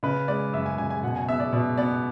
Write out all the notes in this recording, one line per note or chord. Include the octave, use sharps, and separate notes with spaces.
C#3 B4
G#3 D5
F#2 E5
G#5
C#3 G#5
G#5
B2 F#5
G#5
B3 E5
D5
B2 D5
B3 D5